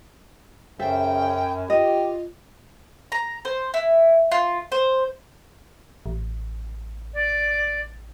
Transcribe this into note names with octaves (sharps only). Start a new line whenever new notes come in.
F#2 C#3 A4 C5 E5 G5
F4 G4 D#5
A#5
C5
E4
F4
C5
A1
D5